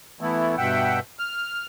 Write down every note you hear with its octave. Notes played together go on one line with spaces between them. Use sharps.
E3 A3 B3 E4
G2 B2 E5 F#5 G5
F6